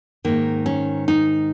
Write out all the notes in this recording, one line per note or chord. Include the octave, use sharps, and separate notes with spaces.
G#2 D#3 A#3
C#4
D#4